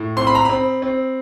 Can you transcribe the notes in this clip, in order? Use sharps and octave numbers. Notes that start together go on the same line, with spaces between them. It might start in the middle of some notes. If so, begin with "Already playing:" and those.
Already playing: A2
C4 C6
B5
A#5
C4 B5
C4